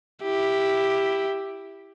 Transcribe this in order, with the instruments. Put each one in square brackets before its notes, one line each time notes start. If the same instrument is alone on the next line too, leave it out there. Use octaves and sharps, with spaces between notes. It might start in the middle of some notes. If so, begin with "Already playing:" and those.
[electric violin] E4 G4